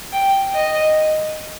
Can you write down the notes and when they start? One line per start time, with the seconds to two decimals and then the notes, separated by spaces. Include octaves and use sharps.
0.13 G5
0.55 D#5